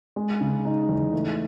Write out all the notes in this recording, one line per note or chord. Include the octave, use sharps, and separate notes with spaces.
G#3
C#3
D#4
E2
A3